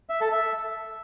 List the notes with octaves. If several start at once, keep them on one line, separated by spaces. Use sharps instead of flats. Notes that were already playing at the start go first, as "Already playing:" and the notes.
E5
A4
E5